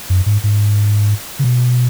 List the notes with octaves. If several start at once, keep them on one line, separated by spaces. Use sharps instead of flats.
F#2
G#2
G#2
C#3
B2